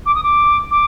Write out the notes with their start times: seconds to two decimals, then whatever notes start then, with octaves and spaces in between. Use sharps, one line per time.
0.05 D6
0.15 D#6
0.23 D6
0.71 D6